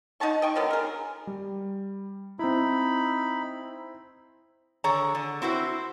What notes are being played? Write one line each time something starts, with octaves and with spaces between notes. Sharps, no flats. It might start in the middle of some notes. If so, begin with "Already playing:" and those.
D#4 F#5 A5 C#6
D#5 G5 C#6
D3 D#3 F#3 B3
G#4 A#4
G3
C4 D#4 E4 B5
D3 G#4 C#5 A#5
D3
C4 E4 F#4 C5